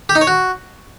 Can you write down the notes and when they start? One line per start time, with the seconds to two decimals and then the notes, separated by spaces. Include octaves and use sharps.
0.09 G4
0.15 D#4
0.21 C#5
0.27 F#4